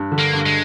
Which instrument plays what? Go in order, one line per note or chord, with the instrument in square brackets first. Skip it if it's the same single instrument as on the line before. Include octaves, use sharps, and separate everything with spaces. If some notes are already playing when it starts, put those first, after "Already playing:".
Already playing: [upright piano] G2
D3
[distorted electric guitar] A#3
[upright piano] G2
[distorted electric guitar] G#3